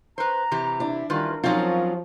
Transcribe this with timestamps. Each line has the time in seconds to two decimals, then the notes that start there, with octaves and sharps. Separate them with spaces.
0.18 B4 C5 A#5
0.51 C3 E3 G4
0.80 D4 E4
1.10 D#3 E3 G3 F4 A#4 B4
1.44 F3 F#3 C4 C#4 D#4 F4